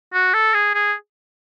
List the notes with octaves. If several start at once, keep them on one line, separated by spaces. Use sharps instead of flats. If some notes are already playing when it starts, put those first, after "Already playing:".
F#4
A4
G#4
G#4